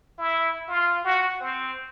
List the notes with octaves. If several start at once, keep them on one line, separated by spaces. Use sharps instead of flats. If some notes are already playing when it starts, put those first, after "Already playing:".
E4
F4
F#4
C4